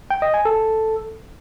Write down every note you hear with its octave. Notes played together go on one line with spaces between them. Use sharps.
G5
D#5
G#5
A4